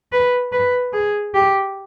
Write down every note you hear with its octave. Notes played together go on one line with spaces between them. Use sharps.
B4
B4
G#4
G4